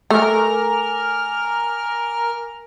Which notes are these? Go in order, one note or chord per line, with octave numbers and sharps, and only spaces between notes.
A3 A#4 G#5 D6 F6